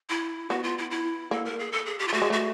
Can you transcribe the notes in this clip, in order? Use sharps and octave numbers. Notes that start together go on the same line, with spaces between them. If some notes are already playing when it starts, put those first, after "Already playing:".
E4
B3 F#4
F4
E4
E4
A#3 A4
A#4
G#4
A4
G#4
G4
F4
A3 F#4
G#3
A3 F#4